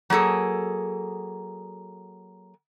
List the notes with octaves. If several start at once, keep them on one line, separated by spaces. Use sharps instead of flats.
F#3 A#3 G#4 A4